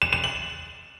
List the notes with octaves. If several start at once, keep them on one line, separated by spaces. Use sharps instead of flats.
E7
E7
F#7